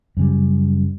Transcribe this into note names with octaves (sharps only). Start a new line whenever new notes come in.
F#2 C#3 G3